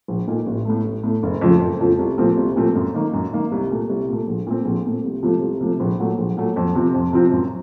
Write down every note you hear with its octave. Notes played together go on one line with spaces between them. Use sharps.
A#1
A#2 A3 D#4
A1
A2 A3
A1
A2 A3
F#1
F2 C#3 F3 A3
F#1
F2 C#3 F3 A3
C2
A#2 F3 A3 C4
C2
A#2 F3 A3 C4
F#2
D#3 A#3
F#2
D#3 A#3
C2
A#2 A3
C2
A#2 A3
A#1
A#2 A3 C4
A#1
A#2 A3 C4
C2
C3 F3 A3
C2
C3 F3 A3
A#1
A#2 F#3 A3
A#1
A#2 F#3 A3
F2
C3 F3 C4
F2
C3 F3 C4
F#2